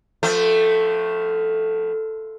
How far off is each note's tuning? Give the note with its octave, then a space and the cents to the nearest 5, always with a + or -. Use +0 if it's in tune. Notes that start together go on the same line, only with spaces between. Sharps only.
F3 +15 A3 +0 C4 -45